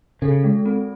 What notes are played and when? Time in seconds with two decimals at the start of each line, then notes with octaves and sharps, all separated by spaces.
0.22 C#3 A4
0.44 G#3
0.66 C4